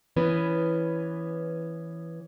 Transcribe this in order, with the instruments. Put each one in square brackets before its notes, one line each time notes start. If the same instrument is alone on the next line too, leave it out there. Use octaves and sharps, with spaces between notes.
[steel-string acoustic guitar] E3 B3 C#4